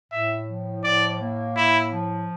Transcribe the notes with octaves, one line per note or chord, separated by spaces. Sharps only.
A2 E5
F3
A2 D5
A#3
A2 E4
F3